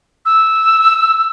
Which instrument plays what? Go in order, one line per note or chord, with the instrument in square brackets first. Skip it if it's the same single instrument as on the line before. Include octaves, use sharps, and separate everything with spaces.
[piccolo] E6